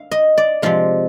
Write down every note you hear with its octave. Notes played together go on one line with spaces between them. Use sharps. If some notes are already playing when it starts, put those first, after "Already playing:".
Already playing: F5
D#5
D5
C3 F3 G#3 F5